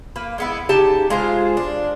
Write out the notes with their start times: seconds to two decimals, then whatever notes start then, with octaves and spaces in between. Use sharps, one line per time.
0.16 A#3 B4
0.38 G#3 B3 E4
0.69 C#3 D#4 G4 A5
1.10 G#3 F4 G#4 C5
1.57 D4